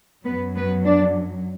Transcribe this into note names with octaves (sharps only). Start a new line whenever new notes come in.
F#2 F#3 B3 B4
B3 B4
D4 D5